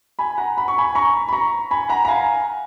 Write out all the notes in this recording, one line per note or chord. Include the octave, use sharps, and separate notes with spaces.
G#5 B5
F#5 A#5
B5
C#6
G#5 B5
A#5 C#6
B5
A#5 C#6
G#5 B5
F#5 A#5
A#5
F5 G#5